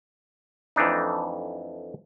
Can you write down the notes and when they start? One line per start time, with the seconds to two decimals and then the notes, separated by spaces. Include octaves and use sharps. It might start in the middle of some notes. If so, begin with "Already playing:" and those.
0.76 F2 E3 A3 D4 D#4